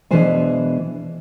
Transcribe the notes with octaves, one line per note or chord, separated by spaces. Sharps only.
B2 E3 G#3 D4 C5 G#5